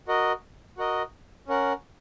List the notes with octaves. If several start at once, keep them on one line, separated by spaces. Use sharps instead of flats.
F#4 A#4 D#5
F#4 A#4 D#5
C#4 A#4 F#5